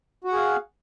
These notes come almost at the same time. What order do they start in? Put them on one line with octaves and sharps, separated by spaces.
F#4 F#5 G#4 F5